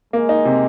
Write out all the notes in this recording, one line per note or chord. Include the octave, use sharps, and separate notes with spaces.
G#3 A#3
D#4
C3